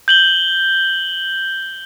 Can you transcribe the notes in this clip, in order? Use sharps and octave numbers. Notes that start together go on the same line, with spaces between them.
G6 F#7 G7